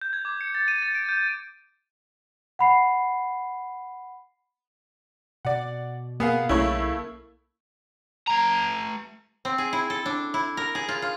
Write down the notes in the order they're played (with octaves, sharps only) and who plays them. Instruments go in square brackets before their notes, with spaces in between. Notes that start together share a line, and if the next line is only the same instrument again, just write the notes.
[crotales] G6
G#6
D6
C#7
A6
D#7
A6
D7
G6
[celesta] F#5 B5 C7
[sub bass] B2 [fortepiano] D5 F#5
[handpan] A#3 [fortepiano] B3 G#4 F5
[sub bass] B1 [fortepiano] C#3 C#5 [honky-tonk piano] A3 E4
[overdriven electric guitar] A3 A#5
[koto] C4
G#4
E4
A4
D4
E4
A#4
G#4
F4
F4